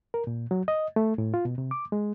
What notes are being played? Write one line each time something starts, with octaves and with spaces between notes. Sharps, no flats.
A#4
A#2
F#3
D#5
A3
A2
F4
B2
C3
D6
G#3